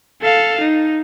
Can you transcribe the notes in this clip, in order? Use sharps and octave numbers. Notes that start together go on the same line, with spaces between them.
A4 F5
D#4